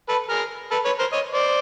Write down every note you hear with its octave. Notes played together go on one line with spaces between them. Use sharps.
A4 B4
G#4 A#4
A4 B4
B4 C#5
A#4 C5
C#5 D#5
C5 D5